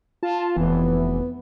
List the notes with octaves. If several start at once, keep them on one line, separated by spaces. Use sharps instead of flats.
F4 A5
F1 E3 B3